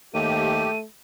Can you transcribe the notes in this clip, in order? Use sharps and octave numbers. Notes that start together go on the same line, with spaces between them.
D#2 A3 G4 D#7